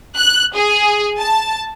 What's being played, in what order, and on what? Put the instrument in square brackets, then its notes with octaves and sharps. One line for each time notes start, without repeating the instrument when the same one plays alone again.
[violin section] F#6
G#4
A5